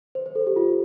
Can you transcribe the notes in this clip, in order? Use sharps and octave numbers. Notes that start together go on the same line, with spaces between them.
C5
C5
A4
G4
F4